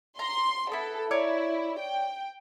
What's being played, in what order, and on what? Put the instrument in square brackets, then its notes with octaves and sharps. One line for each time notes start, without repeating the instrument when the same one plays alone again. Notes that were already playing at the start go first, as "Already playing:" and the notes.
[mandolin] A#5 [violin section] C6
[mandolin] B3 E4 [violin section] A4
[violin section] E4 [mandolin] C#5 D5 A#5
[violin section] G5